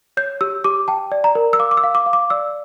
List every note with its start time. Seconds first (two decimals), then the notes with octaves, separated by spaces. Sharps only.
0.17 C#5 G6
0.41 G4 E6
0.64 G4 D6
0.88 G5 A5
1.12 D5
1.24 A#5
1.35 A#4
1.53 E6
1.59 F5 D6
1.71 D6
1.77 E6
1.84 F5
1.95 D6
2.06 F5
2.13 D6
2.30 D5 E6